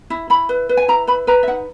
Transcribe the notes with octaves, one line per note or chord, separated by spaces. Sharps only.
E4
E4 B5
B4
B4
G#5
E4 A#5
B4 B5
B4 A#5
E5
D#4 F#5